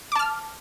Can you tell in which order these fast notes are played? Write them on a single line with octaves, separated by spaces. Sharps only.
D6 A5 F6